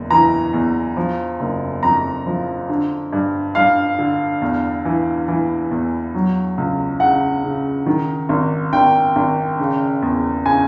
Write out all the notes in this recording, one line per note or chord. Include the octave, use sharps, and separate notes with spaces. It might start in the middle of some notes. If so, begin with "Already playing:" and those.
Already playing: F#1 E2
E3 A#5
E2
F3
F#1
F2 A#5
F3
D3
G2
G2 F5
D3
E2
E3
E3
E2
F#3
C#2
C#3 F#5
C#3
D#3
G#1
G#1 G5
G#1
C#3
E2
C#3 G#5